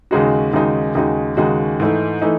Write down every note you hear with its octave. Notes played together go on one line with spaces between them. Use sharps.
D#2 C#3 G#3 D#4 F#4
D#2 C#3 G#3 D#4 F#4
D#2 C#3 G#3 D#4 F#4
D#2 C#3 G#3 D#4 F#4
G#2 E3 A3 D#4
E3 A3 D#4